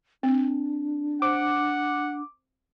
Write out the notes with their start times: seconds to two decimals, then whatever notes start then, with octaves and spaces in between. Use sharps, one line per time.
0.23 C4 D4
1.22 C5 F#5 D6